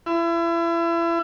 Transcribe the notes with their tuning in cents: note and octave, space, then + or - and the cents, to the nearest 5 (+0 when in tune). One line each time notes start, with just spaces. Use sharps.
E4 +35